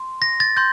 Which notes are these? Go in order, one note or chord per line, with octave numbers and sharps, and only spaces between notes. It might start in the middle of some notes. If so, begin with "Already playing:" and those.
Already playing: C6
A#6
A6
C6 G6